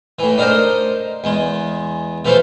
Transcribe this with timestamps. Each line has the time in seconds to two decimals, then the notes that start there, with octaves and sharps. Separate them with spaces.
0.19 A2 E3
0.38 D4 D#4 A#4 C5 D#5
1.24 E2 G#3
2.25 E3 F3 A3 A4 C5